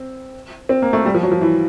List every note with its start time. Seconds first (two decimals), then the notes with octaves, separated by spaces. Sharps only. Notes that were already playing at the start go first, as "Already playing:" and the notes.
Already playing: C4
0.69 C4
0.82 A#3
0.93 A3
1.05 G3
1.15 F3
1.23 F#3
1.32 F3
1.41 E3